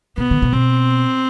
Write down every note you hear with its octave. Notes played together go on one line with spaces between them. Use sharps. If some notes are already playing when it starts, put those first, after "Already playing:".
C3 B3
D3
C3
B2 C4